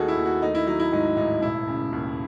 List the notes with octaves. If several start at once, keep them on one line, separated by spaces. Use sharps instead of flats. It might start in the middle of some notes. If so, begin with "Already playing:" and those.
Already playing: D#2 D#3 A3 F#4 G#4 A4
E4
D#2
F#4
A3 D#4
E4
F#3 D#4
E4
G#2 D#4
A1 D#4
E1 E4
C#3
D#2